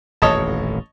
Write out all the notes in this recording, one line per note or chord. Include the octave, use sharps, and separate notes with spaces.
D#1 A1 F2 C#5 D#5 A5